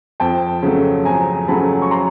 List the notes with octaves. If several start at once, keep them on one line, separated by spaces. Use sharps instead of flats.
F2 G5 A5
C#3 F#3 A3
F2 G#5 A#5
C#3 F#3 A3 A5 B5
C#6
A#5 C6